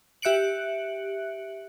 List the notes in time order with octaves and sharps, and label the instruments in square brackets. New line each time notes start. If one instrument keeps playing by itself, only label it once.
[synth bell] G4 E5 F#6 C#7 D7 F#7